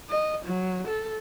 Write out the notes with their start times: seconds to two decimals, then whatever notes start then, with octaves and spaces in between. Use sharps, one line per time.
0.10 D#5
0.45 F#3
0.87 A4